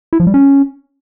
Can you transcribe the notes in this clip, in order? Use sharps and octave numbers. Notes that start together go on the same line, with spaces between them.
E4
F3
G3
C#4